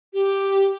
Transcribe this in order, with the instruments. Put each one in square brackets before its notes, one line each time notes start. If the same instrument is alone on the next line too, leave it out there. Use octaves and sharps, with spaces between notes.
[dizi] G4